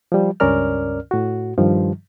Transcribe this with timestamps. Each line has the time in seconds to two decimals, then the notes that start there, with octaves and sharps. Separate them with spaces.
0.12 F3 G3
0.40 C#2 G2 C#4 A#4 D5 F6
1.11 A2 F#4
1.58 G2 D#3 F3 G3